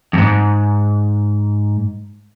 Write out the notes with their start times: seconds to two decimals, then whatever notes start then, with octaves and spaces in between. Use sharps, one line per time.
0.13 F2 G#2